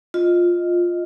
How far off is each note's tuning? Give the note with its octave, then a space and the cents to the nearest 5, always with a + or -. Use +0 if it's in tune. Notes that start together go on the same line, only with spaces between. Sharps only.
F4 +5 D#5 +0